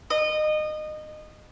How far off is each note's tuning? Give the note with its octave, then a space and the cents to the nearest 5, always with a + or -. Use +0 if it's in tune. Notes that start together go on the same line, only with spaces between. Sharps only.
D#5 -25